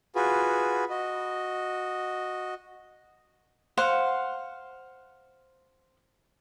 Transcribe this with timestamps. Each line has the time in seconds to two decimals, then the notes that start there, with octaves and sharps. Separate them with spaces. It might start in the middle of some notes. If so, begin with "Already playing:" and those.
0.15 F4 F#4 G#4 B4
0.90 F#4 D#5
3.77 C5 F5 F#5